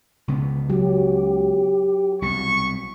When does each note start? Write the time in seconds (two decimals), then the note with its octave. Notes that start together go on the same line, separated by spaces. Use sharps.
0.28 C#2 C#3 B3
0.70 F#3 G4
2.22 C2 B2 C#6